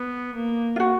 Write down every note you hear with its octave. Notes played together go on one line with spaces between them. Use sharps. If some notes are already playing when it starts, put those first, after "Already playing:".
Already playing: B3
A#3
F4
F#4